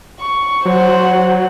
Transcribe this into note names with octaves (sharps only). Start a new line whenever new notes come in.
C#6
F#3 C5 F#5